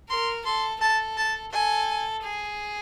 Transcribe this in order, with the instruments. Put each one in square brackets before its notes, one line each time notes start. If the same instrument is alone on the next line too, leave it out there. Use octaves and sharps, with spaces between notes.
[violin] A#4 [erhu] C6
[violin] A4 [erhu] C6
[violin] A4 [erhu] A5
[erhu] A5
[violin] A4 [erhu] G#5
[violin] G#4